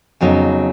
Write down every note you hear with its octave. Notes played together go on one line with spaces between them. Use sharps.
F2 C#3 F#3 B3 D#4